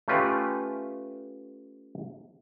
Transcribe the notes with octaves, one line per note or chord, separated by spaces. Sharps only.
A3 C#4 F4 G4 B4